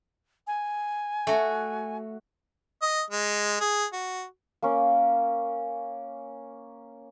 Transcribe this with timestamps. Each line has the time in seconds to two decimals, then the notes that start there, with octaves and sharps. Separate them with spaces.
0.47 G#5
1.27 A3 F#4
2.82 D#5
3.10 G#3
3.60 G#4
3.93 F#4
4.62 A#3 C#4